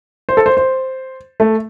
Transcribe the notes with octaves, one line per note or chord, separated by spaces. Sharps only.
C5
A4
C5
C5
A3